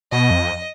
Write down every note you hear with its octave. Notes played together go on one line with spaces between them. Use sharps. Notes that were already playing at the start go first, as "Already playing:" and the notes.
B2 D#5
F2